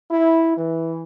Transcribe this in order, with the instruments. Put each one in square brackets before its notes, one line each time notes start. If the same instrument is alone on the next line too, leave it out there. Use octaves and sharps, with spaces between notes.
[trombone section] E4
E3